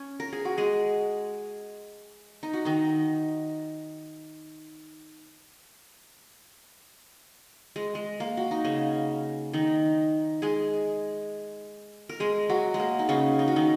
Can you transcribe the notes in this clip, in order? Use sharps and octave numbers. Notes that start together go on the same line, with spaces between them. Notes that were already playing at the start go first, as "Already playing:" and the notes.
Already playing: C#4 C#5
A#4
G#4
F#4
G#3 G#4
D#4
F#4
D#3 D#4
G#3
G#3
A#3
F#4
D#4
C#3 C#4
D#3 D#4
G#3 G#4
A#4
G#3 G#4
F#3 F#4
G#3
A#3
D#4
C#3 C#4
D#4
F#4
D#3 D#4